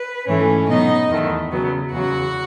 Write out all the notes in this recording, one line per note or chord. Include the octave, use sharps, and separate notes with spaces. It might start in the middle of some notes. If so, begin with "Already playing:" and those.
Already playing: B4
G#2 E3 A3 C#4 C#5
B2 F#3 B3 D#4 D#5
E2 D#3 A3
C#3 F#3 B3
E2 C#3 F#3 F#4 F#5